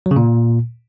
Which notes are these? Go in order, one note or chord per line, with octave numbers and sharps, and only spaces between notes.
F#3
C#3
A#2